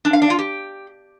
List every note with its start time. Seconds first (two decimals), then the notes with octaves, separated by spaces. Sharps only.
0.05 D4
0.13 F5
0.22 D4
0.30 F4
0.39 G4